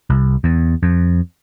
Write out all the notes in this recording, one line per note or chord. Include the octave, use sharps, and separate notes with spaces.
C2
E2
F2